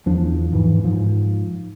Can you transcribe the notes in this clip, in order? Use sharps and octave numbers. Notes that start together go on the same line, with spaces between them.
E2 F3 D4
G#2 E3
G#2 F3